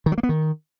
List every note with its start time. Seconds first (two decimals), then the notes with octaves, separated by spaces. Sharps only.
0.06 D#3
0.12 F#3
0.18 A#3
0.23 B3
0.29 D#3